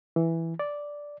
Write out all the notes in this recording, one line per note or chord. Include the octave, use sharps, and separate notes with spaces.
E3
D5